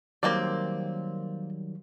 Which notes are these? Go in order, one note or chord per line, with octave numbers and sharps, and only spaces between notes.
D#3 F#3 G3 A#3 C4 D5